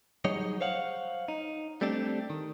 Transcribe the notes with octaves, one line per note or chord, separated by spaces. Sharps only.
F#3 G3 D#4 G#4 C#5 D#5
C5 C#5 F5 F#5
D#4
G3 A3 C4 D4 G4
D#3